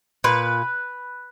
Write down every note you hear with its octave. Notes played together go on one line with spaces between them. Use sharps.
A#2 B4